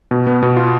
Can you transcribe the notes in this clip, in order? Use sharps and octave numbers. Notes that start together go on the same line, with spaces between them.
B2
B3
B2
F4